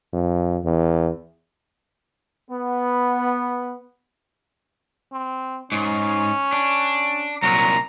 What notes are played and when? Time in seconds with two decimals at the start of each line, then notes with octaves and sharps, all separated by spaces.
0.13 F2
0.65 E2
2.50 B3
5.13 C4
5.72 G#2 C#4
6.53 D4
7.43 C2 A#2 F#3 A#5